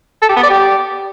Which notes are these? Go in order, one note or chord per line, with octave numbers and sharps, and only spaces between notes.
A4
G4
B3
D5
G4